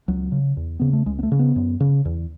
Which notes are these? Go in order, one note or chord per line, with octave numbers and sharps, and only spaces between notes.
C#2 F#3
C#3
E2
C#3 B3
A3
C#2 G#3
B3
A3
C#3
B3
F#2
C#3
E2